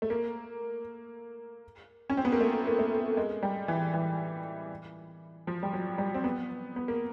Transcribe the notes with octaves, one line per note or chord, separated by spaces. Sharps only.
A3
A#3
C#4
C4
B3
A#3
A3
A#3
A3
G#3
G3
E3
E3
F3
G3
F#3
G3
C4
B3
B3
A#3